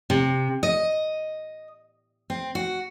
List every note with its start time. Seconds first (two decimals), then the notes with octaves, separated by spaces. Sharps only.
0.10 C3
0.63 D#5
2.30 C4
2.55 F#4